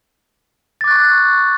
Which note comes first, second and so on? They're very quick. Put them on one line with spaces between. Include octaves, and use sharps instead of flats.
A6 D6 F#6 C#6 G#6